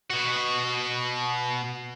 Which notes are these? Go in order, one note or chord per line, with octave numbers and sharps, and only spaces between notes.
B2 F#4